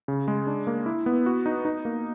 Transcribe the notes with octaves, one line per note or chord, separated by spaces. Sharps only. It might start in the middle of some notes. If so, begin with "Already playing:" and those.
C#3
G#3
D4
A#3
E4
B3
F#4
D#4
D#4
A#3